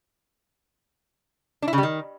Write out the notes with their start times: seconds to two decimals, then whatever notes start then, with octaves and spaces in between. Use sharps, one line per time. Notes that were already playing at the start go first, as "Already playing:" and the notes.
1.62 D4
1.68 E4
1.73 C#3
1.78 G3
1.83 D#3